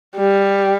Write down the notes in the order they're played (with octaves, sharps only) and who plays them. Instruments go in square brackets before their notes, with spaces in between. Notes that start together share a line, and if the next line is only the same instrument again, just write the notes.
[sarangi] G3